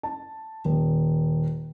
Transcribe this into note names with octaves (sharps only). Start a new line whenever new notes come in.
A5
D#1